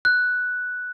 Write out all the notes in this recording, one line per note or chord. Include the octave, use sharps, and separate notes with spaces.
F#6